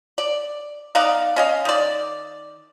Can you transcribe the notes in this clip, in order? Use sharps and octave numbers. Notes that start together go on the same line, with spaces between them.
D5
B3 D#4 D5 F5
C#4 D#5 F5
D#3 D5